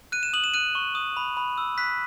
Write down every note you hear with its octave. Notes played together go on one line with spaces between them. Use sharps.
F#6 D#7
E7
D#6 F#7
E7
F#6 D#7
C#6
D#6
B5
B5
E6
F#6 B6